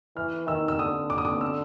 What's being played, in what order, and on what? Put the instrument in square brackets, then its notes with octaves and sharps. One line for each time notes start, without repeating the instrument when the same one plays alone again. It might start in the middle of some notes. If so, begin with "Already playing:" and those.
[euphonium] E3 [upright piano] F6
[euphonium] D#3 [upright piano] E6
[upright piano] E6
[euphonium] D3 [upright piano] D#6
[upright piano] D6
D#6
D6
E6